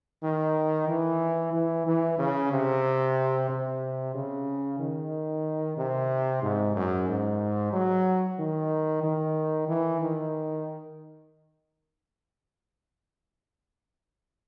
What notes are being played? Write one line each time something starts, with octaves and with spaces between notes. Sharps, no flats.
D#3
E3
E3
E3
C#3
C3
C3
C#3
D#3
C3
G#2
F#2
G#2
F#3
D#3
D#3
E3
D#3